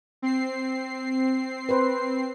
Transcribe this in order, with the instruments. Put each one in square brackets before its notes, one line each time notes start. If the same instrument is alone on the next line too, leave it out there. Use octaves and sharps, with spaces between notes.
[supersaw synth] C4 C7
[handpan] B4 C5